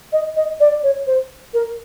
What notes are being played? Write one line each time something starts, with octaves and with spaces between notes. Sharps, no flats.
D#5
D#5
D5
C#5
C5
A#4